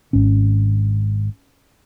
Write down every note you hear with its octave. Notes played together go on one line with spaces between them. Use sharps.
G#1 G#2 C#4